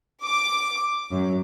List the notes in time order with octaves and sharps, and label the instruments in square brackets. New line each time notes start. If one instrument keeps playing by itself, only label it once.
[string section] D6
F#2